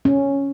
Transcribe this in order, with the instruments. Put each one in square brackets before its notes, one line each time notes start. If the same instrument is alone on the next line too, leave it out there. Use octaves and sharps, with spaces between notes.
[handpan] C#4